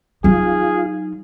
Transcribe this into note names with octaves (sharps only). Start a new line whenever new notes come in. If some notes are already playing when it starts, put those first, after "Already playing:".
F#3 D#4 F4 G#4